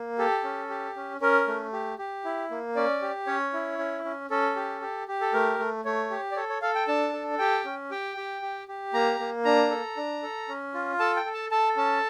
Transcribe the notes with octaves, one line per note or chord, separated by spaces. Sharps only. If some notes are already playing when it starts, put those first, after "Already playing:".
Already playing: A#3
G4 A4
C#4
G4
C#4
C#4 A#4
A3
G4
G4
E4
A#3
C#4 D5
G4
C#4 C#5
E4
C#4
C#4
C#4 A4
G4
G4
G4
A4
A3 A#4
A3
A3 C#5
G4
D5
A4 C#5
C#5
A4 F5
G5
D4 A5
A4
G4 G5
C#4
G4 G5
G4
G4
G4
A#3 A#5
A#3
D4 A#5
A4
D4
A4
C#4
F4
A4 A5
G5
A4
A5
A4 A5
C#4 A5